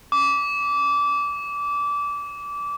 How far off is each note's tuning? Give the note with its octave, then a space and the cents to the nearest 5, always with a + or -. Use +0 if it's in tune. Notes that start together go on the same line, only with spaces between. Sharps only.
D6 -25